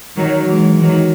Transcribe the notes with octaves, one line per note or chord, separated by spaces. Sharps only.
D#3 F#3
E3 G#3
D#3 F#3